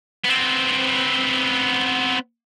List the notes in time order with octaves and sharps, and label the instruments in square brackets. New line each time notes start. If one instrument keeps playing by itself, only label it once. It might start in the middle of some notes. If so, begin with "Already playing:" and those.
[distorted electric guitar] B3 C4